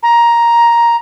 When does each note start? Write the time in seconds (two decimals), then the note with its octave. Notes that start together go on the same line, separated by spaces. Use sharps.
0.03 A#5